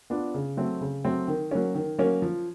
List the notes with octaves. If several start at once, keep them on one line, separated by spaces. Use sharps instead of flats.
B3 D4 F4
C#3
F#3 A3 C4
C#3
F#3 A3 C4
D#3
F#3 A#3 C#4
D#3
F#3 A#3 C#4
F3